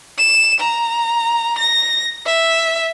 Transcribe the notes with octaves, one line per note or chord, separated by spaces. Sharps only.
E7
A#5
A#6
E5